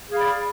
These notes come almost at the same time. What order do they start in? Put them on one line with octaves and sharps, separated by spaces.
G#4 F5 B5 D5